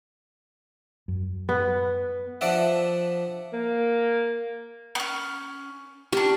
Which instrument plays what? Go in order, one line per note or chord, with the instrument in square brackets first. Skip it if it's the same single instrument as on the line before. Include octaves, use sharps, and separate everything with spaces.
[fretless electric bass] F#2
[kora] B3
[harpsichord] F3 D4 D5 E5 F#5
[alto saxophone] A#3
[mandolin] B3 C#4
[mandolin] C#4 D4 [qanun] G4